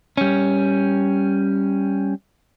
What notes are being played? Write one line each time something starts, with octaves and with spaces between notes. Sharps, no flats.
G3 C#4